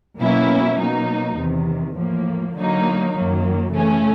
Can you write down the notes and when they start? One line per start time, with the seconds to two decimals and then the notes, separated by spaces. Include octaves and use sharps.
0.19 B2 F#3 A#3 C#4 E4
0.79 B2 F#3 A#3 D#4
1.37 E2 C3 D#3
1.96 A2 F3 A#3
2.55 D3 F#3 A#3 D#4
3.14 F#2 D#3 F#3 A#3
3.73 C#3 E3 A3 C#4